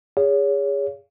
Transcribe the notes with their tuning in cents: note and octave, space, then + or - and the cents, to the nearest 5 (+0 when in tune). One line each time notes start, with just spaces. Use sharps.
G#4 -25 C#5 +25 F5 -15